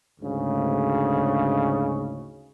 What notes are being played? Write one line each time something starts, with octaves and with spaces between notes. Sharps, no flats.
D2 G#2 C#3